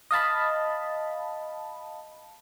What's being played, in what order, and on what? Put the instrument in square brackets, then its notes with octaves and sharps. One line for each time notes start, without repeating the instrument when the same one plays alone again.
[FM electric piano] D#5 F5 A5 B5